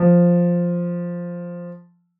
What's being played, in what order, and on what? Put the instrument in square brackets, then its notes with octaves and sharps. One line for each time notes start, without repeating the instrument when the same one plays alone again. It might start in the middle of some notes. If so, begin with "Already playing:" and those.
Already playing: [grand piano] F3